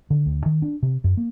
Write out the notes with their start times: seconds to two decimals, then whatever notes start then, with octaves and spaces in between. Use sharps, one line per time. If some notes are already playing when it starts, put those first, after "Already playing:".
0.10 D3
0.26 D2
0.46 D#3
0.62 D4
0.83 C3
1.04 F#2
1.17 A#3